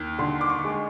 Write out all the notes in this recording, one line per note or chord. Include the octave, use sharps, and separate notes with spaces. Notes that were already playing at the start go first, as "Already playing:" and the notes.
Already playing: D#2
D3 C6
D6
C#6
G#3